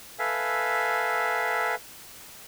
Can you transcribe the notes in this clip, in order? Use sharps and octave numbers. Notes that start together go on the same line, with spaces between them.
A4 B4 E5 F5 G#5